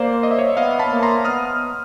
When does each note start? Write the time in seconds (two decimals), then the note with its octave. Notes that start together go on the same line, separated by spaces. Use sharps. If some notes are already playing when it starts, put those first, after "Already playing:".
Already playing: A#3 C5 D5
0.23 D#5
0.31 E5
0.39 C#5 D#5
0.57 B3 D#5 F5
0.79 A5 B5
0.91 A#3
1.03 A#5 C6
1.25 B3 D#6 F6